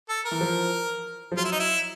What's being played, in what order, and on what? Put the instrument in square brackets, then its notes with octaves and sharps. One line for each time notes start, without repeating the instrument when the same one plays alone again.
[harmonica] A4
A#4
[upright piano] E3
F3
F3
[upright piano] F#3 [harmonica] F4
[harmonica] E4
D#4
E4